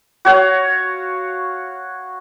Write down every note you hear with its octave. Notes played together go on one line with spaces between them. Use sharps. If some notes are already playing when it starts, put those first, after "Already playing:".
F#4 C#5 F5